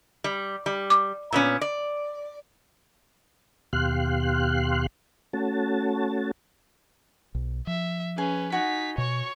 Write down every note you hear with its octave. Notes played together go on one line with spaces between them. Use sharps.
G3
G3
D6
A#2 B3 C#4
D5
D#2 B2 G4 F5 C6 F#6
A3 C#4 F#4 A5
B1
F3 E5
C#4 G#4 B4
D#4 F#4 G#5 B6
B2 C#5 C#6